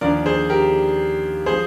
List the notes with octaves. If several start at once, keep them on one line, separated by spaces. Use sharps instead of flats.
D#2 D3 F3 A#4 D5
G#4 C5
G4 A#4
F3 G#4 C5